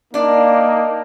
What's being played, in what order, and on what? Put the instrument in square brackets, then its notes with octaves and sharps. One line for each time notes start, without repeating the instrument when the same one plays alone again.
[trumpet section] A#3 D#4 [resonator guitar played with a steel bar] D4 D5